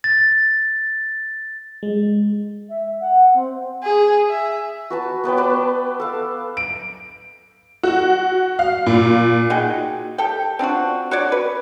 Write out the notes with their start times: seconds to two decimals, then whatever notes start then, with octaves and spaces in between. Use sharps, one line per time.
0.04 A6
1.83 G#3
2.69 E5
3.00 F#5
3.34 C4
3.83 G#4
4.29 E5
4.90 F#4 B4 A5
5.24 B3 B4 C#5 G5
5.37 B4 D5 A5
6.00 A4 F5
6.57 D7
7.83 F#4
8.59 F5
8.86 A#2
9.50 D#4 F#4 G#4 G5
10.18 G4 A4 G5
10.59 C4 D4 F4 F#4
11.11 F#4 C#5 D5
11.32 B4